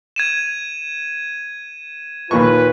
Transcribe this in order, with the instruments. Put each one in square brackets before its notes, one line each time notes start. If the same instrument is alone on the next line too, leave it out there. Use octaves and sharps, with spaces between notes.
[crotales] G#6 D#7 E7
[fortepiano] D#2 A#2 C#6 [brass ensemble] F4 B4